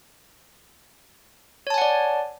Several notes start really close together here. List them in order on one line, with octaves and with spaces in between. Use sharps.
C#5 A5 G#5 F#5 D5